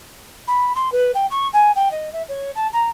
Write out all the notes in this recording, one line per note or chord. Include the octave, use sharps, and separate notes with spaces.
B5
C6
B4
G5
C#6
G#5
G5
D#5
E5
C#5
A5
A#5